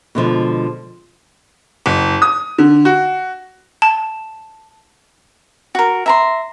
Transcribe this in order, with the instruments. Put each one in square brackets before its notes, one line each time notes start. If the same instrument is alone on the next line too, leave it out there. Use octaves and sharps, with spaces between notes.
[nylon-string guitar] B2 D3 F3 G#3
[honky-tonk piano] F#1
D#6
D3
F#4
[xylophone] A5
[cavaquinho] F#4 A#4
E5 A#5 C6